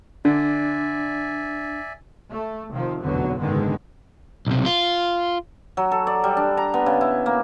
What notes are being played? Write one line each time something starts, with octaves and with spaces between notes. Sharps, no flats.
D3 D4 D5 E5 G#5
A3
C3 D#3 F3
F1 B1 E2 D3 F#3 B3
F#1 G#2 D3 D#3 G#3 B3
B1 C3
F4
F#3
A4
D5
G3
D4
A#5
B3
C#3
E4
A#3